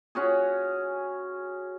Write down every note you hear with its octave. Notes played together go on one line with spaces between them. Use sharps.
C#4 F#4 G#4